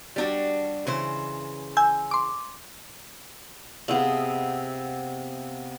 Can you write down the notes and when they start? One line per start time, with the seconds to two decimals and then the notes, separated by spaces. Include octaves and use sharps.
0.16 G3 D4 F#4
0.87 C#3 E3 C5
1.77 G#5 E6 G6
2.11 C6 D6
3.88 C3 B3 G#4 E5 F5